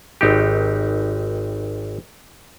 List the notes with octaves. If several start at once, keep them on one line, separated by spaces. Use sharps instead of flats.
G#1 D#4 G4